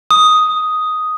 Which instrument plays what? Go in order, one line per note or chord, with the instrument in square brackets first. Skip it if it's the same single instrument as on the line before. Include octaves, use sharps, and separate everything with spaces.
[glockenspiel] D#6